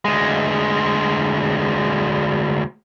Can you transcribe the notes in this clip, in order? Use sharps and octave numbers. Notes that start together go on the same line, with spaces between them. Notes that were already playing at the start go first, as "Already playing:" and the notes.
D2 G#3